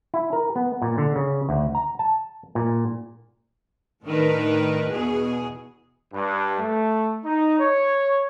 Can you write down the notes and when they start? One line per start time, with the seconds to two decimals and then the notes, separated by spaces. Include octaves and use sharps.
0.14 E4
0.33 A#4
0.56 B3
0.82 A#2
0.98 D3
1.16 C#3
1.49 D2
1.75 A#5
1.99 A5
2.55 A#2
4.06 A2 D#3 D4 A#4 B4
4.89 E2 B2 G#4
6.13 G2
6.59 A3
7.24 D#4
7.60 C#5